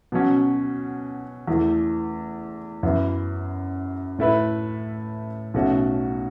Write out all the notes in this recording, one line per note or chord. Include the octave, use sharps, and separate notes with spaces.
B2 F#3 C#4
E2 E3 A3
F#2 E3 B3 E4
A2 A3 E4 B4
B1 B2 A3 C#4 F#4